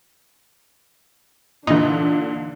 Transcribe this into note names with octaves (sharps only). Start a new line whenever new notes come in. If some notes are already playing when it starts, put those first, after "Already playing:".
A#2 D3 E3 D4 D#4